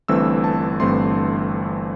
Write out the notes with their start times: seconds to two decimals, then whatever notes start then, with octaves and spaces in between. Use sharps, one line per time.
0.08 G1 G2 E3 A3 C4 E6
0.44 A5
0.80 G1 G2 E3 A3 C4 C6